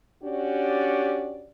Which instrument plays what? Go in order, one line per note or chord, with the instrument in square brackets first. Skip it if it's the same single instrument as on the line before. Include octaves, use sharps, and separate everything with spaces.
[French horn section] C#4 D4 F#4 G4 D5